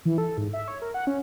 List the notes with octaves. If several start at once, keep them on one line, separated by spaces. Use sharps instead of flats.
E3
A4
G#2
E5
C#5
A#4
F#5
C#4